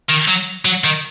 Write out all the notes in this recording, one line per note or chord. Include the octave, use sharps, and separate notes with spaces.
D#3
F#3
F#3
D#3